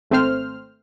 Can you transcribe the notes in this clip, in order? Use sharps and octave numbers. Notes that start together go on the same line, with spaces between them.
G#1 A3 C4 C5 F6